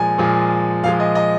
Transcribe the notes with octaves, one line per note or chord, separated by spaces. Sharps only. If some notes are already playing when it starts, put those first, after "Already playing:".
Already playing: A#2 F3 G#3 G#5
A#2 F3 G#3
A#2 F3 G#3 F5
D#5
D#5